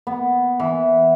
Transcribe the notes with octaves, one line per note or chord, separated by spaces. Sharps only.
B3
E3